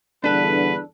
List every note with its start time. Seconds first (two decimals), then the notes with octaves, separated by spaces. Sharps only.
0.24 E2 G2 D3 D4 A4 B4